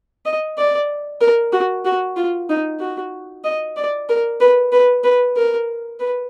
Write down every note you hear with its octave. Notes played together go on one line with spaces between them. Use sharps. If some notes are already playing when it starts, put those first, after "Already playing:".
D#5
D5
A#4
F#4
F#4
F4
D#4
F#4
D#5
D5
A#4
B4
B4
B4
A#4
B4